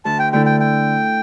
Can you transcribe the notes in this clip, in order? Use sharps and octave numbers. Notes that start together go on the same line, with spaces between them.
D2 A5
G5
D3 A3 E4 A4 G5
G5
G5